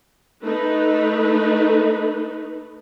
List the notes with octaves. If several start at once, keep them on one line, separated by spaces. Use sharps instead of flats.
A3 D#4 B4